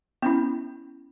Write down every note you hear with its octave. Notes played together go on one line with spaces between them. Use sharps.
B3 C#4 E4